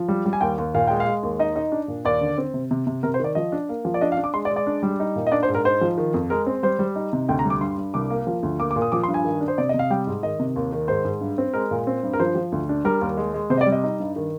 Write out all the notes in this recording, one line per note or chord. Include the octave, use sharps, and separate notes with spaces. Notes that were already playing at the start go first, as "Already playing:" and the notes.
Already playing: F3
G3
G3
G#5
D#2 G5
D#2
A#2 F5
G#3 G5
F5
G#3
D#2
D#4 D#5
D#4
D4
A#2
D#2 D5
D3
C4
C3
C3
C3
C3 A#4
C5
D#3 D5
F3 D#5
D4
A#3
F3
D5
D4 D#5
F5
D4
D6
G#3 C6
D5
G#3
D5
D4
G3
D#4
A#2
D#5
D4 D5
C5
G#2
A#4
D#4 C5
F3
D#3
F2
G#3 A#4
C4
G3 C5
G3
D#4
C3
D2 G5
A#5
G3
D6
G2 C6
G2
C2 D6
A#3
F3
D2
A#3 D6
D6
A#2
D#6
F3 D6
C6
G2
G#5
D#3
D4
C5
C3 D5
C3 D#5
F5
G3 G5
G#2
D#3 D#5
C3
D#2
D#3
G#2 C5
G#2
G2
C4
G#3 A#4
A#2
C4
G2
A#4
F3 C5
F3
D2
D4
G3 A#4
D#2
G#3
G#3
C3 C5
D#5
D5
G3
D#5
D#4
G2
D#3